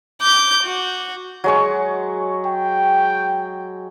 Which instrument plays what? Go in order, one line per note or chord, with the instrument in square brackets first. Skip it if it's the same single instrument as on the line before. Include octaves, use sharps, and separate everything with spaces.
[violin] D6 G6
F#4
[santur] F#3 G#3 C#6
[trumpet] G5